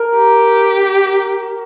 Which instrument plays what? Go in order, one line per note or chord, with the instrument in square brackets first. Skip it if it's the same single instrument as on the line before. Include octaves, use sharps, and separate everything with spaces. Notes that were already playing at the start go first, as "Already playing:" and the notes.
Already playing: [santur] A#4
[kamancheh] G4